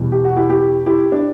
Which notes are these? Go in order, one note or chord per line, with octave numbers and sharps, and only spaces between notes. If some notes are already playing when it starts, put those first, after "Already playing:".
Already playing: E2 B2 G3
G4
F#4
E4 G4
E4 G4
E4 G4
D4